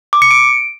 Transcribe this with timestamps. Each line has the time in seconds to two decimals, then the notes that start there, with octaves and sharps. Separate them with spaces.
0.13 D6
0.22 C#7
0.31 D7